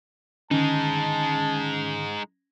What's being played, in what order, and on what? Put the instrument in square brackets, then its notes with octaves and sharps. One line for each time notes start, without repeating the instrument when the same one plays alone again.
[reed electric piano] D3 D#3 [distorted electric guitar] G#3 D#4 [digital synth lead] C#4 [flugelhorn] A5